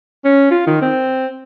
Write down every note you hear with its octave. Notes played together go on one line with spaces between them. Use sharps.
C#4
F4
D#3
C4